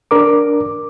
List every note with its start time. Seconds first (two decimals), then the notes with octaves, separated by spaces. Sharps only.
0.11 D4 A#4 D6